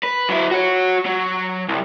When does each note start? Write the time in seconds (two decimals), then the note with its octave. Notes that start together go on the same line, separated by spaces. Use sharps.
0.03 B4
0.29 F#3 E4
0.51 F#4 C#5
1.05 F#3
1.69 C2